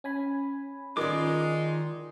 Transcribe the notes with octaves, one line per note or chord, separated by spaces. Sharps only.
C#4 G#5 B5
D#3 G#3 D#4 F4 A#4 D5 D6